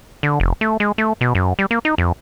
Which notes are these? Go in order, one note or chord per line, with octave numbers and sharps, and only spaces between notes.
D3
F1
A3
G#3
A3
B2
F#2
G3
A#3
D#4
F2